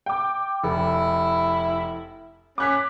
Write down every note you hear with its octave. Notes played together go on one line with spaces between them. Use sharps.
G5 D6
F1 E4
C#4 D6 F#6 B6